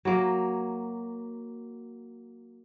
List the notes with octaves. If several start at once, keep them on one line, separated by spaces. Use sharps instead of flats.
F#3 A#3